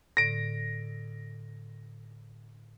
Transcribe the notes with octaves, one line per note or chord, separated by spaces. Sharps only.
A2 D3 A#6 D7